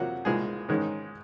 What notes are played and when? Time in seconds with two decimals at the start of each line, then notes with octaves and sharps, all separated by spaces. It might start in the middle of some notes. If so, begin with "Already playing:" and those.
Already playing: F2 C3 F3 F#3 A#3 F#4
0.25 C2 A#2 G#3 G#4
0.69 G#2 D#3 G#3 C#4